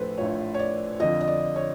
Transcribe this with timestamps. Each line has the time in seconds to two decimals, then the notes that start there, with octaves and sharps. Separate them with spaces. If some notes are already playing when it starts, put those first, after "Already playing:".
Already playing: A#1 A2 F3 A4 B4 C5
0.18 A#1 A2 F3 C#5
0.54 C#5
0.59 D5
1.00 F2 D3 F3 D#5
1.21 D#5
1.28 D5
1.56 C#5